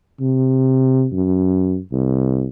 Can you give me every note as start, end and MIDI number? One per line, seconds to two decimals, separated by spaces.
0.20 1.07 48
1.12 1.78 42
1.92 2.48 36